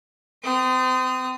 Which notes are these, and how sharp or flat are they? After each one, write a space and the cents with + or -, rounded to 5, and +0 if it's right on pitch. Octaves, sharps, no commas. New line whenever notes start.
C4 -30 D#6 +0